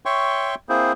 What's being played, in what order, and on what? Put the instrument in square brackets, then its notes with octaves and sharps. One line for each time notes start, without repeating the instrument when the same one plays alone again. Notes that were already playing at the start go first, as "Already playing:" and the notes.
[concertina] C#5 E5 G5 C6 C#6
A#3 C4 E4 G#4 C5